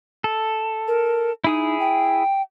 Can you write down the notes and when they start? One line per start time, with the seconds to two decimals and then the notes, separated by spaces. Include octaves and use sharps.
0.24 A4
0.88 A#4
1.44 D#4 E4 G#4 D#6
1.80 G5